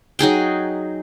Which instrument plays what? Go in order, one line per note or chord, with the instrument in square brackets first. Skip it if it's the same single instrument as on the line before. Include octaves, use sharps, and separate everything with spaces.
[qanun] F#3 D#4 G#4 G5